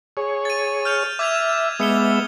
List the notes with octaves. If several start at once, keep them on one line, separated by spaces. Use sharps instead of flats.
G#4 C#5
A6 D#7
F6 G6 F7
E5 D6 G#6 F7
G#3 B3 E5 D#6 C#7 G7